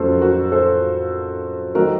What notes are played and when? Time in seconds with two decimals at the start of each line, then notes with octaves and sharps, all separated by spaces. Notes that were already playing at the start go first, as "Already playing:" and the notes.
Already playing: F2 C#3 F#3 A3 F4 F#4 A4 C5
0.21 F#4 A#4
0.52 A4 C5
1.75 D#3 F#3 A3 F#4 A#4